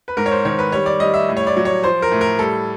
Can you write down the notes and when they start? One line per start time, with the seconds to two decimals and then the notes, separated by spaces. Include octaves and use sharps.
0.08 B4
0.17 G#2 A#4
0.26 C#5
0.31 C5
0.45 D#3 C#5
0.59 B4
0.72 G3 C#5
0.86 D5
1.00 G3 D#5
1.14 E5
1.29 A2
1.37 C#5
1.47 D5
1.56 F#3
1.65 C#5
1.83 F3 C5
2.02 A#4
2.12 A2
2.21 A#4
2.39 G3 A4